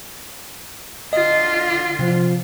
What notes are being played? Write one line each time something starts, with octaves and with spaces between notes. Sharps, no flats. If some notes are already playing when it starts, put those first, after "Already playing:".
D3 F4 D#5
C3 F3